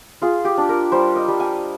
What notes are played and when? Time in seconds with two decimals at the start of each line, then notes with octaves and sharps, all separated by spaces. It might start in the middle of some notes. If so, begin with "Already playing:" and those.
0.22 F4 G#4
0.45 G4
0.58 D4
0.69 A#4
0.92 G3 C5
1.16 D#5
1.28 G3
1.40 G#5